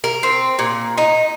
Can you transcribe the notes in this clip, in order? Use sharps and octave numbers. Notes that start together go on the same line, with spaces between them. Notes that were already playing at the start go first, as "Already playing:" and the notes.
A#4
C4
A#2
D#4